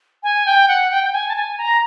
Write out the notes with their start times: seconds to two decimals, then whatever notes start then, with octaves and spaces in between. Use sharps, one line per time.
0.23 G#5
0.46 G5
0.68 F#5
0.91 G5
1.04 G5
1.13 G#5
1.28 A5
1.36 G#5
1.58 A#5